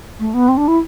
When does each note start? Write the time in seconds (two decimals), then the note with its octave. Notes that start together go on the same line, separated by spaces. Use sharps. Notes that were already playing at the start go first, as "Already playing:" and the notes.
0.20 A3
0.34 B3
0.48 C4
0.57 D4
0.68 E4